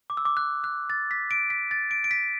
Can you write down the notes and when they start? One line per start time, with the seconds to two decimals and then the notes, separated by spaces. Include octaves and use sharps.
0.10 D6
0.17 E6
0.25 D6
0.37 F#6
0.64 F#6
0.90 A6
1.11 B6
1.31 D7
1.50 B6
1.71 A6
1.91 D7
2.04 D7
2.11 B6